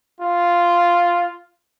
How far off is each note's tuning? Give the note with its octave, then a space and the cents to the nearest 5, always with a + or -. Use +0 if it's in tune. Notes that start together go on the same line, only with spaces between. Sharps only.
F4 -5